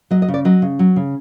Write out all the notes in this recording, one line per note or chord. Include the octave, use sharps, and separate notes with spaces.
F#3 D#5
D#5
C#3
D5
F#3 D#5
C#3
F#3
C#3